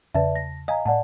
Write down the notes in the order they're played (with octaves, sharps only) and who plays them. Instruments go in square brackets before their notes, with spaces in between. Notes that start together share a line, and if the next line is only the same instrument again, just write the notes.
[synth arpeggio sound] E2 C#3 A5 [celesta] B4 D5 E5
[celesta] A#6
[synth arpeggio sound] D#5 G#5 [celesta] F5 A#5
[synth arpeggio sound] A2 [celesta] D5 F#5 A5